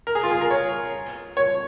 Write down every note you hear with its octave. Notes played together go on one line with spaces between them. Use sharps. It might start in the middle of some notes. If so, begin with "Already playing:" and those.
A#4
G#4
F4
G#4
A#4
C#5
C#5